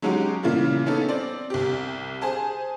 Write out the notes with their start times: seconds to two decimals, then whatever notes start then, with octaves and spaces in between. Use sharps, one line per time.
0.02 F#3 G#3 C#4 D#4 F#4 G4
0.43 A#2 C#3 E3 F3 G3 A#3
0.86 B3 C#4 D#4 A4
1.09 C4 D5
1.50 C2 G4
2.21 G#4 C5 G#5 A5